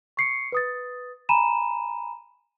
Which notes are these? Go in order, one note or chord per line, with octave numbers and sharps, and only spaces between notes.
C#6 C7 C#7
B4 D#6 A6
G#5 A#5 B5 D#7 E7